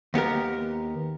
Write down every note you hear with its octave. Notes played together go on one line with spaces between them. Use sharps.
D#2 B3 G4 A#4